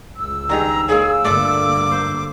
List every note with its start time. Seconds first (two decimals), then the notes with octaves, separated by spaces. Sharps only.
0.16 C#2 E6
0.49 G2 D#3 G#4 A#5
0.88 C#3 G#3 A#3 G#4
1.25 G2 D3 A3 A#3 D4 F4 D6
1.91 C5